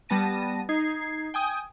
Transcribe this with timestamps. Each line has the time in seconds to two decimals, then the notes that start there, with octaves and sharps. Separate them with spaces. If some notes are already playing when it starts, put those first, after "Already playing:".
0.09 G3 B3 A5 A#6 D#7
0.69 D#4 G#6 C7
1.34 G5 G#5 D#6